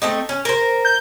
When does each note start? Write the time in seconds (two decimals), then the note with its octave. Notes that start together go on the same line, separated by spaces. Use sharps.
0.02 A3 C4 D#4
0.29 C#4
0.45 A#4 C5
0.85 G6